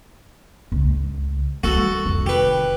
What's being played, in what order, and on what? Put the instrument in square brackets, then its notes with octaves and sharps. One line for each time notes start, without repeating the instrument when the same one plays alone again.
[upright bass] C#2
[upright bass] E3 G3 [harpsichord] F#4 A4
[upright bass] F1 D#3
[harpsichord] G4 B4